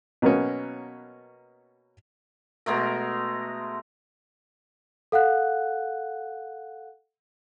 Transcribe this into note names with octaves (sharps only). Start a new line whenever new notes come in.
B2 F#3 A#3 B3 C#4
B2 G#3 A3 A#4
A4 F5 F#5 F#6